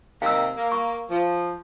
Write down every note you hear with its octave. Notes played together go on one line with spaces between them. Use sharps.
C3 D#3 A#3 F5 E6
A#3
C#6
F3